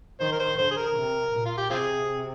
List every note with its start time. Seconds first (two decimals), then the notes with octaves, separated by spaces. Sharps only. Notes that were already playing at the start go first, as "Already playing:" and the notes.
0.20 D#3 C5
0.32 A#4
0.39 C5
0.58 D3 C5
0.71 G#4
0.77 A#4
0.96 C3
1.33 A#2
1.46 F4
1.58 G4
1.70 C3 C4 F4 G#4